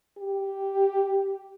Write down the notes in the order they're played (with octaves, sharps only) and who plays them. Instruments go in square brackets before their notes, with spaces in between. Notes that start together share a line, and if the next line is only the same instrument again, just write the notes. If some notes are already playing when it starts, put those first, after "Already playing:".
[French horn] G4